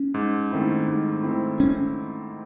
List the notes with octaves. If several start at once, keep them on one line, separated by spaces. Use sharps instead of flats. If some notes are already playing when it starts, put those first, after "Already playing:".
Already playing: C#4
G#2
D#3 A3 C4 E4
G#2
D#3 A3 C4 E4
C#4